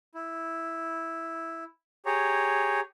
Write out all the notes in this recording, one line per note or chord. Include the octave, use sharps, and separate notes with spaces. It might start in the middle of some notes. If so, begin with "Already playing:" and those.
E4
G4 G#4 C#5 A#5